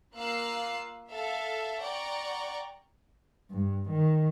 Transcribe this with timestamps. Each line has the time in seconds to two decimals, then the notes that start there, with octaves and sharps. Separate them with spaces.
0.16 A#3 F4 F5 E6 F#6 C7
1.10 A4 E5 F5
1.81 D5 F#5 G5 A#5 C#6
3.51 G2
3.90 D#3